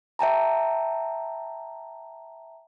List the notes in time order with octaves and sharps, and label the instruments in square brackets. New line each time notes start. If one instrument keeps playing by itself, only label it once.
[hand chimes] E5 G5 A5 A#5